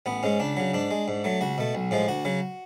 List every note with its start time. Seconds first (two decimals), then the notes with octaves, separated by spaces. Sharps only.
0.06 A1 B3
0.23 G#2 G#3 C#4
0.40 C#2 D4
0.57 C#3 F#3
0.73 G#2 D4
0.91 G#3
1.08 G#2
1.24 F#3 A3
1.41 C#2 F#4
1.58 B2 A3
1.75 B1
1.91 A2 F3 G#3
2.08 D2 F#4
2.25 C#3 F#3